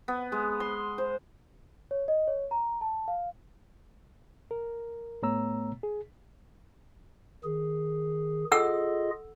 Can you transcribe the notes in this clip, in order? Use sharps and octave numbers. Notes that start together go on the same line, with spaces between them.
B3
G#3
C6
C5
C#5
D#5
C#5
A#5
A5
F5
A#4
A2 A3 B3 C#5 A#5 E6
G#4
D#3 G#4
F4 G#4 A4 D#5 F#5 E6